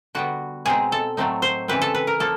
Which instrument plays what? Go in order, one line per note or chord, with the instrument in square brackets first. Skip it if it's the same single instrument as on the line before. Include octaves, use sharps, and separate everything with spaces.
[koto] D3 G3 B3 F#4
B2 G#3 C4 D#4 G#4
A4
A2 F#3 A3 C4 D#4
C5
C#3 E3 G3 C4 B4
A4
B4
A#4
F3 A#3 A4